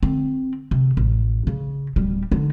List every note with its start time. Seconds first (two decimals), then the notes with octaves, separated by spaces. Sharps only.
0.03 D3 C4
0.71 C3
0.97 A1
1.47 C#3
1.96 D1 G3
2.32 D3 D#4